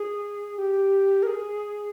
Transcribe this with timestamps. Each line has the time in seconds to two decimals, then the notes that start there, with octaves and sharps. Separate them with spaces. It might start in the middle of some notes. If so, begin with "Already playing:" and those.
Already playing: G#4
0.58 G4
1.23 A#4
1.27 G#4